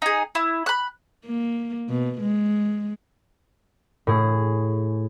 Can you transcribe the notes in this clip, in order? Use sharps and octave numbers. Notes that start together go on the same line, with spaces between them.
D#4 G#4
E4
B5 F#6
A#3
B2
G#3
A2 G#4